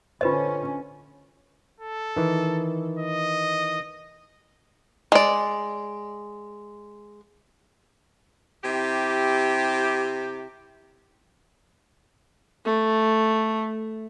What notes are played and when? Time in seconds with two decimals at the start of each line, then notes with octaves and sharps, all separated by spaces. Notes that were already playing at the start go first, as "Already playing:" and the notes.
0.21 D3 C#4 F4 B4 C5 D#5
1.80 A4
2.17 D#3 E3
2.99 D#5
5.12 G#3 D5
8.64 C3 E4 G4
12.65 A3